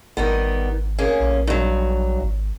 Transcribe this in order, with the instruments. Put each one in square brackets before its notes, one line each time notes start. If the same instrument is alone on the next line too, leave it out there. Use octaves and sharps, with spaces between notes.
[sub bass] G#1 [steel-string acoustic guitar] D#3 G3 B3
[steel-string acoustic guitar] A#3 C#4 G#4
[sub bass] A#1
[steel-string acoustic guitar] G2 F#3
[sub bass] G#1